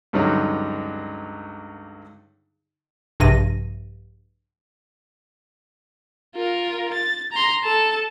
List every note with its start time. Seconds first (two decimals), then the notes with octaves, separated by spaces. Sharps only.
0.13 C#2 G2 D3 F#3 D#4
3.20 A#1 G2 C3 A#6 D#7
6.36 F4 A#4
6.94 A6
7.32 A#5 C6
7.63 A4 A5